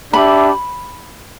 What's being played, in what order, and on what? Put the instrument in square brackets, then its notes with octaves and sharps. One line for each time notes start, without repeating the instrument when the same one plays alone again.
[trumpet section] D4 G4 E5 [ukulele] B5